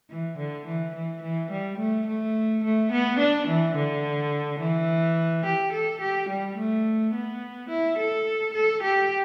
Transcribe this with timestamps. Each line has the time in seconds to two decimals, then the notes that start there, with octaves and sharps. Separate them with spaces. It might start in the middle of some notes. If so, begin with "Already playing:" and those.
0.10 E3
0.38 D3
0.66 E3
0.95 E3
1.22 E3
1.51 G3
1.79 A3
2.07 A3
2.64 A3
2.92 B3
3.19 D4
3.48 E3
3.76 D3
4.60 E3
5.45 G4
5.73 A4
6.01 G4
6.29 G3
6.58 A3
7.14 B3
7.70 E4
7.98 A4
8.54 A4
8.83 G4